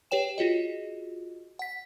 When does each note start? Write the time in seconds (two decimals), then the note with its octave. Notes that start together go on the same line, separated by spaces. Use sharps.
0.11 G4 B4 C#5 G5 E7
0.38 F4 F#4 G#4 D#5
1.59 F#5 B6